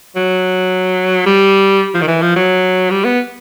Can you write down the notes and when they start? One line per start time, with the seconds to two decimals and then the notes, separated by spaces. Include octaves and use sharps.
0.16 F#3
1.26 G3
1.94 F3
2.01 D#3
2.08 E3
2.22 F3
2.36 F#3
2.90 G3
3.05 B3